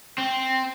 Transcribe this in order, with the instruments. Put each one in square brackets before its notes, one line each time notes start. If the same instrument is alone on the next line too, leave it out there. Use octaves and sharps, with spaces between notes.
[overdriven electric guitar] C4